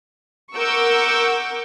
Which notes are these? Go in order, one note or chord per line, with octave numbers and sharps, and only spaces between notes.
A#4 F#5 C#6 D6 E6 G6